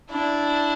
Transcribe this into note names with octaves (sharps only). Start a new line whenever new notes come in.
D4 E4